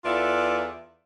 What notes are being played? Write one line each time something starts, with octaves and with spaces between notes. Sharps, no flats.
E2 F4 A4 B4 D5 E5